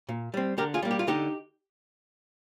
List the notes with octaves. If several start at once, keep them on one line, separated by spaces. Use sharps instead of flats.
A#2
G3 C4
D3 G4 A#4
F4 G#4
G3 A#3
G4
F4
D3 D#4 G4